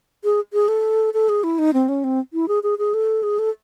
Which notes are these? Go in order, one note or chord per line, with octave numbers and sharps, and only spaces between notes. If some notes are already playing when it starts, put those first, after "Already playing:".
G#4
G#4
A4
A4
G#4
E4
D#4
C4
C#4
C4
E4
G#4
G#4
G#4
A4
G#4
A4